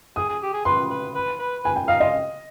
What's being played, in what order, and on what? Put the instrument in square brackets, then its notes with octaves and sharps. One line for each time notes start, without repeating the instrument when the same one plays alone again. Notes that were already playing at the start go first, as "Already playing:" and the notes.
[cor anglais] G#4 [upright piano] D#6
[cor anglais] G#4
G4
G#4
[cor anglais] B4 [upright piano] C6
[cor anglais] B4
B4
B4
[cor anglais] B4 [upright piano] G#5
[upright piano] G5
[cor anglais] D#4 [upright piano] F5
[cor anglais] F4 [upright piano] D#5